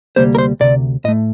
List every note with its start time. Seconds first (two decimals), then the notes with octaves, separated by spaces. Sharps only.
0.16 D2 C3 G3 A#3 C5
0.35 A#4
0.38 C5
0.60 D2 C3 D5
1.04 A2 D#5
1.08 A3